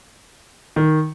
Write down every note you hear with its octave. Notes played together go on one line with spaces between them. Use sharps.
D#3